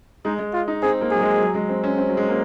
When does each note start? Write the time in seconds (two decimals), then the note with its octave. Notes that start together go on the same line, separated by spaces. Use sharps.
0.25 G#3 D#4
0.39 G#3
0.53 F4
0.68 D#4
0.82 C4 G#4
1.01 A#3
1.11 F#3 G#4
1.21 G#3
1.40 F#3
1.54 G#3
1.69 C4
1.84 C#4
1.98 C4
2.09 F#3
2.17 G#3
2.29 A#3